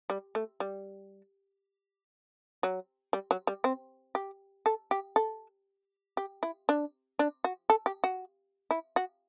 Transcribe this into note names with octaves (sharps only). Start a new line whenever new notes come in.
G3
A3
G3
F#3
G3
F#3
G3
C4
G4
A4
G4
A4
G4
E4
D4
D4
F#4
A4
G4
F#4
E4
F#4